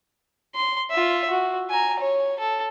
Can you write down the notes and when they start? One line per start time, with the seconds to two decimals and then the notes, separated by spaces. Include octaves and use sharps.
0.55 C6
0.91 F4 E5
1.30 F#4
1.70 G#5 A#5
2.00 C#5
2.39 A4